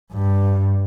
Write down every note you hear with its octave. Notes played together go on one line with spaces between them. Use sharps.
G2